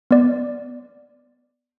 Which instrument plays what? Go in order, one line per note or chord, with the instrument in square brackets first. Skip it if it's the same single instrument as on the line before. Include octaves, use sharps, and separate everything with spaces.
[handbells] B3 D5